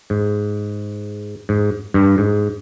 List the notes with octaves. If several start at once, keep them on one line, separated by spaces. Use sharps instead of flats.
G#2
G#2
G2
G#2